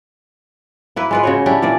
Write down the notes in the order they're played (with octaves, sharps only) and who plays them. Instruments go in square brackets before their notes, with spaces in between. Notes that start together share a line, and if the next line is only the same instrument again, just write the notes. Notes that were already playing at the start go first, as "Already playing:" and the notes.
[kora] A#3 E4 B4
G#3 F4 B4
C#3 F#4 C#5
C#4 D4 E4 G4
A#2 E3 D5